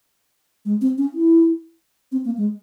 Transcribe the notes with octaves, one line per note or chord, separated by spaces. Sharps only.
G#3
C4
C#4
E4
C4
A#3
G#3